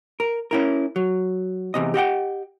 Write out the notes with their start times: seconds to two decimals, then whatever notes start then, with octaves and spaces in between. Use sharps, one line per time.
0.20 A#4
0.51 C#4 E4 A#4
0.96 F#3
1.74 E2 C3 D#5
1.94 G4 D#5 F#5 G5